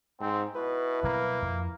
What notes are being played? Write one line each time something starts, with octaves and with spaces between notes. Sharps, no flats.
G#2 C4
B2 E4 B4
B2 F#3 G3 A#3
F2